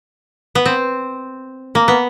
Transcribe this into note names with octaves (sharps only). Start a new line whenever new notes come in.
B3
C4
A#3
B3